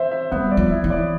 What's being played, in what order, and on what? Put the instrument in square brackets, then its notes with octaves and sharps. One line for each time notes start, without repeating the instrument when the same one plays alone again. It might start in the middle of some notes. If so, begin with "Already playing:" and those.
Already playing: [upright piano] C5 E5
E5
[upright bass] G3 [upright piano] B3
[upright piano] D5
[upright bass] F3
[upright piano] E4
[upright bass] E3
[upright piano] D5